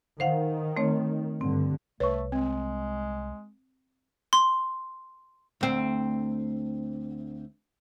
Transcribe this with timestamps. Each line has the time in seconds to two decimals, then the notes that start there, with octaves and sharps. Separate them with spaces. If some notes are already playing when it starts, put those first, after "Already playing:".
0.20 D#3 C5 F5 F#5
0.77 A3 C4 C#5
1.41 G2 D3 C4
2.00 C2 A3 B4 C#5 C#6
2.32 G#3 C4
4.33 C6
5.61 D2 C4